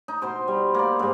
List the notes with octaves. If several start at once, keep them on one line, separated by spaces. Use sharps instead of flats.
D#4
B2 C5 C6
G3
A#3 D5
G#2 G3